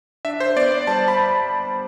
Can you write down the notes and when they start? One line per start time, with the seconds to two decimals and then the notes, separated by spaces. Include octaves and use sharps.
0.25 D4 E5
0.40 C5
0.56 B3 D5
0.72 D5
0.87 G3 A5
1.08 B5